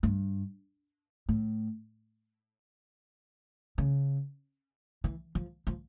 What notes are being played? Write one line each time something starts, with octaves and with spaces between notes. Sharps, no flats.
G2
A2
C#3
E3
F3
F3